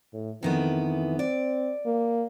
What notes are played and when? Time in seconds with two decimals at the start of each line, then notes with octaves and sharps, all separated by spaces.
0.13 A2
0.43 F2 D#3 E3 B3
1.19 C4 D5
1.86 A#3